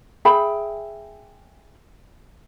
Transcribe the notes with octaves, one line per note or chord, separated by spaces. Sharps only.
G#4 E5 G5 B5